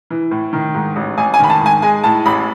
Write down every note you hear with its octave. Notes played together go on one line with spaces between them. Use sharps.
E3
A2
D#3
G#2
A1
A1 G#5
G#5
D#3 B5
A5
G#2 G#5
G#3 G#5
A2 A5
A1 B5